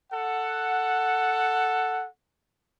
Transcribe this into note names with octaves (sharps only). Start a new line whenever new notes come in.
A4 F#5